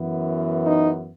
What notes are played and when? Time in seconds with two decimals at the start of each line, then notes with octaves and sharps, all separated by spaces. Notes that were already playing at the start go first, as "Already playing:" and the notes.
Already playing: F#2 E3 B3
0.66 D#4